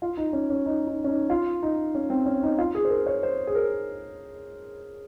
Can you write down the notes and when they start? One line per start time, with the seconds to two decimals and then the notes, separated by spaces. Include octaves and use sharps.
0.02 F4
0.17 D#4
0.33 C#4
0.50 C#4
0.66 D#4
0.87 D#4
1.04 C#4
1.08 D#4
1.30 F4
1.63 D#4
1.95 C#4
2.10 C4
2.26 C#4
2.43 D#4
2.58 F4
2.75 G#4
2.85 C5
2.90 A#4
3.06 C#5
3.23 C5
3.47 G#4
3.55 A#4